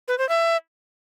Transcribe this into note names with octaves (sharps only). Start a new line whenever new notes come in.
B4
C5
E5